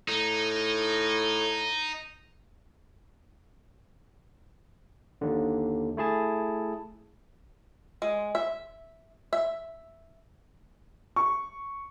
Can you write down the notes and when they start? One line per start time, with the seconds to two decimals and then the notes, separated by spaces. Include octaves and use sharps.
0.08 A2 D#4
5.21 D#2 D3
5.97 A3 E4 G#4 A5
8.02 G#3
8.35 E5
9.33 E5
11.16 C#6